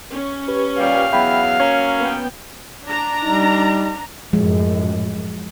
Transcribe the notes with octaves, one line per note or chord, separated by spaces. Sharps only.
C#4
G4 B4
A#2 G3 F5
E2 F#3 E5 G5 B5
F#3 A#3 C#4 G#6
B3 G5
D4 A#5
G3 D#4
F#2 A2 F3 G#3